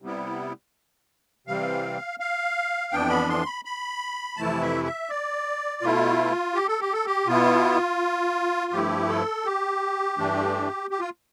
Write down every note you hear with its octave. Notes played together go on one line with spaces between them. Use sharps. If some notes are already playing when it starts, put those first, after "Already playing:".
C3 G3 B3 E4
C3 E3 G3 C4 F5
F5
F2 E3 B3 D4 G5
B5
C6
B5
B5
F2 C3 E3 A3 E4 A5
E5
E5
D5
B2 A3 E4 F4
G4
A4
G4
A4
G4
B2 B3 E4 F4
G2 F3 A3 E4 G4
A4
G4
G2 E3 A3 D4
G4
F4